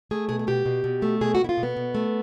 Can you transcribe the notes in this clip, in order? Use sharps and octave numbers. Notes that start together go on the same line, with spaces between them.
A3 G#4
B2 G#4
G#4
B2 G4
B2
B2
A3
B2 G#4
F#4
B2 E4
F4
B2
B3
B2
A3